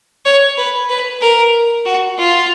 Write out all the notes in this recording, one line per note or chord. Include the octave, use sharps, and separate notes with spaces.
C#5
B4
B4
A#4
F#4
F4